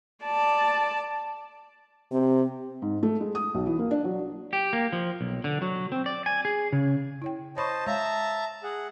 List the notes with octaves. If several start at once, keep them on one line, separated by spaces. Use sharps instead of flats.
D5 A5
C3 C4
G#2
A3
G#3
D#6
B1
E3
A#3
D4
F#3
G4
A#3
F3
B1
D3
F#3
C4
D5
G#5
G#4
C#3
E4 C#5 G5
C5 C#5 D#5 A5 B5 C#6
G#3 C#5 E5 F5 A5 A#5
G#4 F#5